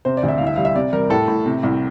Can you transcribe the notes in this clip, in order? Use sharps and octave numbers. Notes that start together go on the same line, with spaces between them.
C3 C5
D5
D2
E5
C2 F5
E5
G3 F5
E5
C3 D5
G3 A#4
A2 A4
A2
C3
C2